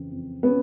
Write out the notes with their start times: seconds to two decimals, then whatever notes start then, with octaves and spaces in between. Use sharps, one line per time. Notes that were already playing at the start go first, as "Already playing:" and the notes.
Already playing: F2 C#3 E3 C4
0.12 F2
0.43 B3 C#4